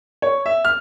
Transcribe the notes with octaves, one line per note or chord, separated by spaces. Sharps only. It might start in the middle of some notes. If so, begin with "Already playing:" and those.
C#5
E5
F6